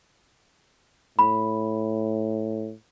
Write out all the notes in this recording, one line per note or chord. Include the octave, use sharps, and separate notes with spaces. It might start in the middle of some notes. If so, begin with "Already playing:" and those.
A2 B5